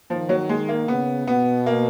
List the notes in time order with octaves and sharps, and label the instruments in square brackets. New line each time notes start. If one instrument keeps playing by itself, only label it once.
[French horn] D#3 [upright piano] F3
[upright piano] F#3
G#3
A#3
[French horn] C#3 [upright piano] B3
[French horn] B2 [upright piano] B3
[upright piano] A#3